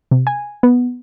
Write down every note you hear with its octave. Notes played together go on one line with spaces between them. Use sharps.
C3
G#5
B3